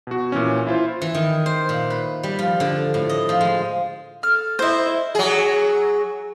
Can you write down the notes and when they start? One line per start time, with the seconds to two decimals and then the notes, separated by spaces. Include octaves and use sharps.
0.07 B2 F#4
0.32 A#2 E3 C#4
0.67 E4 F4 C5
1.02 E3
1.15 D#3
1.46 C5
1.69 A#2
1.90 B4
2.23 G3
2.39 F3
2.60 D3
2.94 A2
3.09 D#5
3.29 F3
3.41 G#3
4.23 A4 F6
4.59 E4 C5 D#5 E5
5.15 F#3 G#4